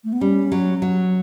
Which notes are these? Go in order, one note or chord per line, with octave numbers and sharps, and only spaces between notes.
A3
B3
G3 C#4
F#3
F#3